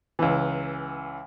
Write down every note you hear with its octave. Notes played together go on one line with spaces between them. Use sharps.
C#2 E3